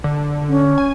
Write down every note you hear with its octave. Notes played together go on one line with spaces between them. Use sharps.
D3
C#4
G#5